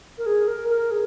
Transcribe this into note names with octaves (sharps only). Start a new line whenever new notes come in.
A#4
G#4
A#4
A#4
G#4